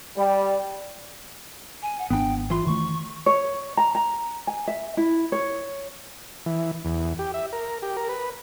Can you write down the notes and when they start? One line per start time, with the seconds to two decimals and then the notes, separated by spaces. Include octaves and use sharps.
0.16 G3
1.82 G#5
1.99 F#5
2.10 G#1 D#3 B3 D4 G5
2.50 E3 F4 C6
2.67 D#3 A3 C#6
3.26 C#5
3.77 A#5
3.95 A#5
4.47 G#5
4.68 E5
4.97 E4
5.32 C#5
6.46 E3
6.85 E2
7.19 G4
7.34 E5
7.53 A#4
7.82 G4
7.97 A#4
8.09 B4